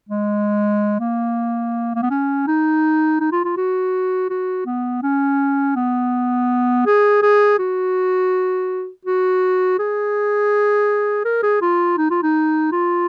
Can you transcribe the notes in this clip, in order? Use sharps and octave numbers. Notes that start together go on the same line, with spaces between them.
G#3
A#3
A#3
B3
C#4
D#4
D#4
F4
F4
F#4
F#4
B3
C#4
B3
G#4
G#4
F#4
F#4
G#4
A#4
G#4
F4
D#4
F4
D#4
F4